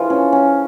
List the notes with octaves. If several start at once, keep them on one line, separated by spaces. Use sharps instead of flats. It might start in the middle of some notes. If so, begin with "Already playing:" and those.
Already playing: E3 F3 F4 G#4
C#4
C#4